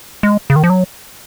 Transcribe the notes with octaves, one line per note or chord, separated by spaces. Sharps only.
G#3
C#3
D#3
F3
F#3